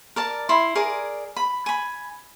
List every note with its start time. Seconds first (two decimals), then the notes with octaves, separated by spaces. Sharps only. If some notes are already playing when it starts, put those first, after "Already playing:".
0.16 A#4 D5 A5
0.49 E4 B5 C6
0.75 G#4 A#4 D5
1.36 B5
1.66 G#5 B5